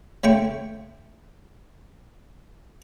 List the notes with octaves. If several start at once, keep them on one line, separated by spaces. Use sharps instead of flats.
C#3 A3 G5 C#6